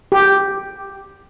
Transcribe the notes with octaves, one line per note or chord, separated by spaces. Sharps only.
G4